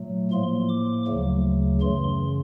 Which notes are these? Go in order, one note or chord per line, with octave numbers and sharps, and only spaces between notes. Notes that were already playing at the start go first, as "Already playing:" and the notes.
Already playing: A#2 F#3 A3
A2 F3 A#3 C6
D6
D2 C#3 F#3 A3
F#2 C#3 E3 C6